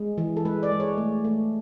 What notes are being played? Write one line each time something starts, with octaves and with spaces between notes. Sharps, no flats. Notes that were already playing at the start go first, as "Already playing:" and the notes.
Already playing: G#3
E3
A4
G#3 B4
D5
G#3
C#5
A3
A3